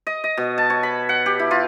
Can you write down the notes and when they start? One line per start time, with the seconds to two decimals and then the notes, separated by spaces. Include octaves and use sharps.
0.07 D#5
0.24 D#5
0.37 B2
0.58 A5
0.70 C#5
0.83 B5
1.09 F#5
1.26 G4
1.39 E4
1.51 F4